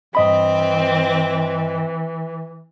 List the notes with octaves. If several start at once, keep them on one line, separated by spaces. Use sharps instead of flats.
G2 E3 C4 D#5 B5